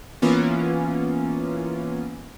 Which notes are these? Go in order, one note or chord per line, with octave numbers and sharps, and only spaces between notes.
E3 A#3 B3 C#4 F4